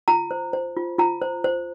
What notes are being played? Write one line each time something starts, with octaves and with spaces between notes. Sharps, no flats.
F4 A#5
C5
C5
F4
F4 A#5
C5
C5